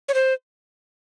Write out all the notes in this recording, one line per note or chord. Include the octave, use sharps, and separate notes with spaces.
C#5
C5